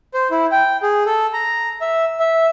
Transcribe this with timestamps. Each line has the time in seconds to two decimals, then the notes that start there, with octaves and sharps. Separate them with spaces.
0.14 C5
0.31 E4
0.52 G5
0.83 G#4
1.06 A4
1.33 A#5
1.81 E5
2.20 E5